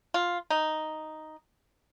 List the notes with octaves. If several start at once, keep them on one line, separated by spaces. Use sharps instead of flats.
F4
D#4